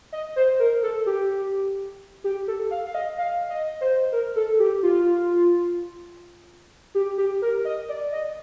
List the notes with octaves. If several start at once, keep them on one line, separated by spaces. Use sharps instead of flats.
D#5
C5
A#4
A4
G4
G4
A4
F5
F5
D#5
F5
D#5
C5
A#4
A4
G4
F4
G4
G4
A#4
D#5
D5
D#5